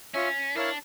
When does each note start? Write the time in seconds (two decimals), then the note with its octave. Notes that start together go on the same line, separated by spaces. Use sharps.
0.14 C#4 F4 C#5 E5
0.56 D4 E4 A#4 C#5 F5 A5